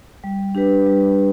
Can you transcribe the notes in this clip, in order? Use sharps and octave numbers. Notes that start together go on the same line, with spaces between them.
G3
D4 G4 B4
G3